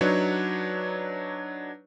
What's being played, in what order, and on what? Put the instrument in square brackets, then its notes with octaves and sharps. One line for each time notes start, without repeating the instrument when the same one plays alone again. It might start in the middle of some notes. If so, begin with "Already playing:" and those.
[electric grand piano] F#3 D4 D#4 B4 C#5